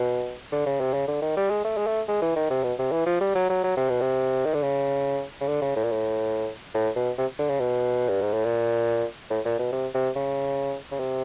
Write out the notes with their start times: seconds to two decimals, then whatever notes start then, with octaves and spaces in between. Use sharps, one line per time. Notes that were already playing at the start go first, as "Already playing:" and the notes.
Already playing: B2
0.53 D3
0.66 C#3
0.80 C3
0.94 C#3
1.08 D3
1.22 D#3
1.37 G3
1.50 G#3
1.65 A3
1.77 G#3
1.87 A3
2.08 G#3
2.22 E3
2.36 D#3
2.50 C3
2.64 B2
2.79 C3
2.92 E3
3.06 F3
3.21 G3
3.35 F#3
3.50 F#3
3.64 F#3
3.77 C3
3.89 B2
4.01 C3
4.45 D#3
4.54 D3
4.63 C#3
5.41 C#3
5.48 D3
5.62 C#3
5.76 A2
5.84 A#2
5.91 A2
6.75 A2
6.96 B2
7.18 C3
7.39 D3
7.50 C#3
7.60 B2
8.09 G2
8.22 G#2
8.34 A2
8.45 A#2
9.30 A2
9.45 A#2
9.59 B2
9.72 C3
9.95 C3
10.16 C#3
10.92 C#3
11.00 C3